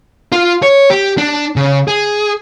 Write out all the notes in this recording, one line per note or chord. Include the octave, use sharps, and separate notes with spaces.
F4
C#5
G4
D4
C#3
G#4